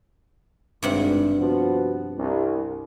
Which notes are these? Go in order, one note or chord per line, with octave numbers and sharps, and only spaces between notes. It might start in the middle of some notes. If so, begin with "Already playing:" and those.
G#1 G2 C3 F#5
F3 B3 F#4
C2